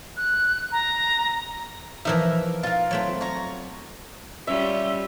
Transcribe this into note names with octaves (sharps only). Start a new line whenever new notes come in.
F#6
A#5
E3 F3 D#4 A#4 E5
F4 A#4
F#3 A3 C4
C#5 A#5
G3 C#4 F4 E5